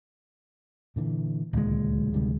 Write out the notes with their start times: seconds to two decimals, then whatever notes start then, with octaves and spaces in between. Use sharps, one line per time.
0.96 A#2 D3 E3
1.53 D1 C#2 A#2 D#3 G#3
2.14 C3 D#3 G3